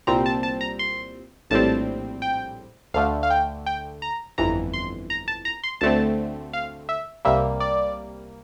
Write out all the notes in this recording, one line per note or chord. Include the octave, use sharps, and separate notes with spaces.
C2 A#2 G3 C4 A#5
A5
A5
A#5
C6
A#1 A2 G3 C4 A5
G5
D2 D3 A3 F5
F5
G5
G5
A#5
G1 F2 E3 A#5
C6
A#5
A5
A#5
C6
D2 D3 A3 C4 A5
F5
E5
C2 C3 G3 A#3 E5
D5